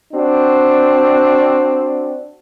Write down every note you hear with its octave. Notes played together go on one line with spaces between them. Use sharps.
C4 D4 F#4